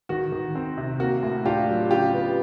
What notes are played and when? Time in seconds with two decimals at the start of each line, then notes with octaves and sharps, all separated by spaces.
0.09 D#3 F#4
0.32 D#3
0.55 C4
0.78 C3
1.00 A#3 F#4
1.23 A2
1.46 D4 F4 G4
1.68 F#3
1.91 C#3 F4 G4
2.14 B3